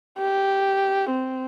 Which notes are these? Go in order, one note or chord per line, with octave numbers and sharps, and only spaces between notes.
G4
C4